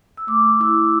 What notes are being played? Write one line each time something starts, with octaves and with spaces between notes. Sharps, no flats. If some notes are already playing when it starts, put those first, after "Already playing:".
E6
A3 D6
E4 E6